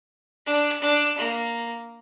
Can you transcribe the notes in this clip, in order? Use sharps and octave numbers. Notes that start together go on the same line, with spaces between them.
D4
D4
A#3